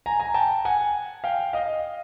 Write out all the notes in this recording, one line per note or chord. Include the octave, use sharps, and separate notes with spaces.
G#5 A#5
G#5 A#5
G5 A5
F#5 G#5
F5 G5
D#5 F5